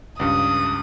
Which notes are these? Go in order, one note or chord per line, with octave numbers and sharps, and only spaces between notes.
C#2 G2 D#6